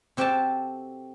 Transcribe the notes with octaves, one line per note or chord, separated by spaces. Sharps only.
C3 C4 F#4 G4 A4 A5